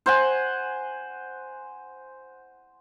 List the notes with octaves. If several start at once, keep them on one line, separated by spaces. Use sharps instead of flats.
C5 F#5 G#5